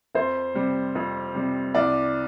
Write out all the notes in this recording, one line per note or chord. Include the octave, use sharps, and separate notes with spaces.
F2 C5
C3 G3
F2
C3 G3
C2 D5